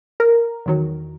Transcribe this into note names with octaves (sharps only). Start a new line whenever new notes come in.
A#4
E2 D#3 F#3